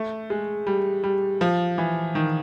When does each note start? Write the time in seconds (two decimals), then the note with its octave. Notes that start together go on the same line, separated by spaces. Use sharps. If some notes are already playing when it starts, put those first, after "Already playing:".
Already playing: A3
0.30 G#3
0.67 G3
1.04 G3
1.41 F3
1.78 E3
2.15 D#3